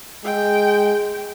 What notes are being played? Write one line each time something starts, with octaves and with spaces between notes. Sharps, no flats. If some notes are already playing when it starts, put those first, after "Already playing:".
G#3 G5